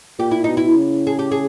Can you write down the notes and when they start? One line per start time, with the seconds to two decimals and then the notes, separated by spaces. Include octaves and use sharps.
0.19 A#2 G4
0.31 E4
0.44 B2 D#4
0.57 E4
0.77 C#3
1.07 G#4
1.19 G4
1.31 G#4